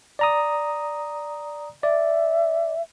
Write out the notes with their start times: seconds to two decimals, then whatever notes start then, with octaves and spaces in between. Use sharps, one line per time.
0.19 D5 A#5 D#6
1.83 D5 E5